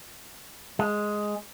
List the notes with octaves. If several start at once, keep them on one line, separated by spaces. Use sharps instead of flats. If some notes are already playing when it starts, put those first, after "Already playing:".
G#3